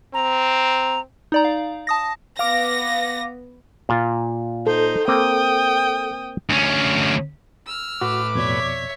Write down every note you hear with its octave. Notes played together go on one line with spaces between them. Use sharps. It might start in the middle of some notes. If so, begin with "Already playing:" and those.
C4 A#5
D#4 D5 A#5
F5
A5 D#6 A#6
B3 F5 D6 A#6
A#2 F4
D#4 A4 C5
A#3 C4 G5 D#6
D2 C#4
E6 F6
A2 F#4 B4 D6
F2 B2 C#5 D5 E5